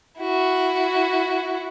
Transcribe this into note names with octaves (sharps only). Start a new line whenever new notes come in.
E4 F#4